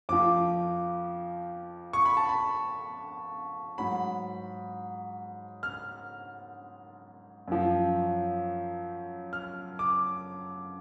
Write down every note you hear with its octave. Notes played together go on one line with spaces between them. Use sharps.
F2 F3 D6
C#6
B5
A5
B5
G#2 F#3 B5
F6
F#2 F3
F6
D6